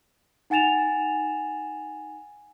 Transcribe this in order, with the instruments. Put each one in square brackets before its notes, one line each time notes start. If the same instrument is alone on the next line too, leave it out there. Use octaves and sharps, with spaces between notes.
[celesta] D#4 F#5 G#5 A6 E7 F7